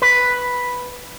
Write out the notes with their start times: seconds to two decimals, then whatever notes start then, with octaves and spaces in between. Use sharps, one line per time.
0.02 B4